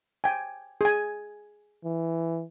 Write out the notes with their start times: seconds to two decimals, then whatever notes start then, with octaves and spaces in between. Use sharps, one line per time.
0.24 G5 G#5
0.81 G#4 G#5
1.85 E3